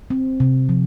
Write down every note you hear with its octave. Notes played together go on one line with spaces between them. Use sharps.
C4
C3
F3